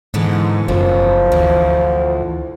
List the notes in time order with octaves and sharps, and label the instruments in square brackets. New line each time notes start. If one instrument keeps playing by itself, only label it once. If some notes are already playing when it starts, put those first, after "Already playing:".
[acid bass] G#2 [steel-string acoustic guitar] D3 E3 B3
[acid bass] F#1 [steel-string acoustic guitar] F#2 B2 B3 [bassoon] F3
[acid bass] D2 [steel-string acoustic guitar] E3